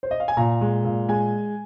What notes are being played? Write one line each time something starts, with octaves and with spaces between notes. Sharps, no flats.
C5
D#5
F5
G#5
A#2 A#5
G#3
A#2
G#3 G#5